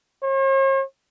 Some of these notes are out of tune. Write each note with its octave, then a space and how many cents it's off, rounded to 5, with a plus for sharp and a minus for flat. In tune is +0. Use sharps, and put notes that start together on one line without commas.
C#5 -45